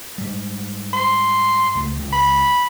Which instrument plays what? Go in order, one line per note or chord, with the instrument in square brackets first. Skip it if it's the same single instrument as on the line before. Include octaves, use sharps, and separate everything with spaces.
[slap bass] G#2 G3
[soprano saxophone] C6
[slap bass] C#2 A3
C#2 G#3
[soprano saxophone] B5